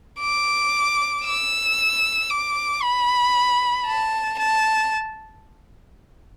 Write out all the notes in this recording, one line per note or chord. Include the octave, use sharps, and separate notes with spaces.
D6
E6
D6
B5
A5
A5